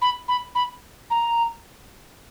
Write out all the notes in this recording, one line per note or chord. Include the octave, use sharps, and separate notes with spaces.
B5
B5
B5
A#5